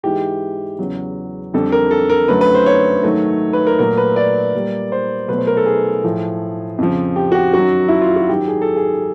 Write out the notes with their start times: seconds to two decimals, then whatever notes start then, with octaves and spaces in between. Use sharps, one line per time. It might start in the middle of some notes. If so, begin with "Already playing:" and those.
0.03 G#2 E3 G#3 G4
0.79 E2 C#3 F#3
1.54 F2 D3 G3 A4
1.72 A#4
1.91 A4
2.10 A#4
2.28 F#2 D3 F#3 A3 B4
2.41 B4
2.54 C5
2.66 C#5
3.03 G#2 D#3 F#3 A3
3.53 B4
3.67 A#4
3.79 A#2 F#3 A3 A#4
3.98 B4
4.16 D5
4.54 A#2 G3 A#3
4.92 C5
5.28 B2 F#3 A3 B4
5.38 C5
5.47 A#4
5.57 A4
5.66 G#4
6.04 A2 F3 A3
6.78 F2 C#3 F3
7.16 G4
7.32 F#4
7.35 G4
7.53 F#2 D#3 F#3 F#4
7.88 E4
8.02 F4
8.16 F#4
8.29 G#2 D#3 F#3 G4
8.48 G#4
8.62 A4
8.76 G#4